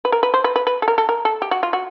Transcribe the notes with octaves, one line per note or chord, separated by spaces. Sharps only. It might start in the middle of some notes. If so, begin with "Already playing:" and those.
B4
A#4
B4
C5
B4
B4
B4
A4
A#4
A4
A#4
A4
G4
F#4
F4
F#4